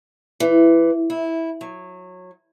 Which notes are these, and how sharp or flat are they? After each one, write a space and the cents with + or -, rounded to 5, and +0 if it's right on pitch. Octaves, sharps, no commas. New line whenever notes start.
E3 +10
E4 -10
F#3 -20